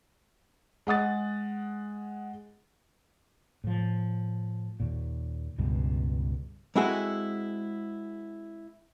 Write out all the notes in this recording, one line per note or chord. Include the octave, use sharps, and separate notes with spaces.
G#3 F#5 D#6 A6
A2 F3
D#2 A#2
C#2 G2 B2
G#3 C4 E4 F#4 G#4 A4